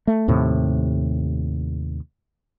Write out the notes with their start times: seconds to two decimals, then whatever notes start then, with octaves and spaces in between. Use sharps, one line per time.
0.07 A3
0.28 D#2 A2 C3